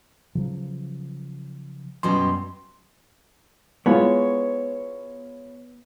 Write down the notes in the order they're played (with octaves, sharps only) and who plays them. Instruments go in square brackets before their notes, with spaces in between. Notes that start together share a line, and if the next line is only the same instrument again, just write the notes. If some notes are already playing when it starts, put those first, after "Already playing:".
[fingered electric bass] C#3 F3 F#3
[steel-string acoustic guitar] F#2 B2 G3 [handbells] C6
[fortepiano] G#3 E4 F4 [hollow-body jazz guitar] B3 [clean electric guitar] C#5